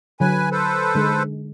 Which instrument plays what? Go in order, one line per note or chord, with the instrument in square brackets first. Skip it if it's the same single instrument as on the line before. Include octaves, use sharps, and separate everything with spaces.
[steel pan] D3 F#3 [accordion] B4 G#5
[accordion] A4 B4 C5
[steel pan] D3 G#3